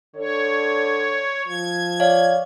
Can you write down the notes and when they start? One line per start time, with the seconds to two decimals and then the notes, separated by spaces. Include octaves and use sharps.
0.16 D3 C#5
1.47 F3 G#6
2.00 C#5 D5 F5